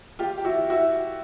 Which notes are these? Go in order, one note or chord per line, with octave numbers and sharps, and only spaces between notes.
F4 G4
G4
E4 F#4
E4 F#4